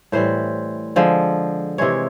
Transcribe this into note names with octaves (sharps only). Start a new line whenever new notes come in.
A2 E3 G3 C5
D3 F3 G#3
C3 E3 G#3 C#5